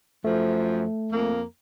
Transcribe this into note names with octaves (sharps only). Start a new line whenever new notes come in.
F#2 F3 A3
F2 A#3